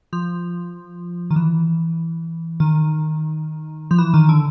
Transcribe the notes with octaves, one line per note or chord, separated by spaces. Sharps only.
F3
D#3
E3
D#3
F3
E3
D#3
D3